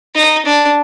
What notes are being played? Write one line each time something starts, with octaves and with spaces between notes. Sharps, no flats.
D#4
D4